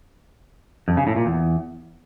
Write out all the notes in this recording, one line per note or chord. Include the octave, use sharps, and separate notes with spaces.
F2
C#3
A2
A#2
E2